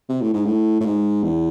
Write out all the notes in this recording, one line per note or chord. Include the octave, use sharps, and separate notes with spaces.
C3
A2
G#2
A2
A2
G#2
E2